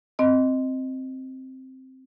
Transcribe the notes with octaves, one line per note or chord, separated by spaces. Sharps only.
C4 D#5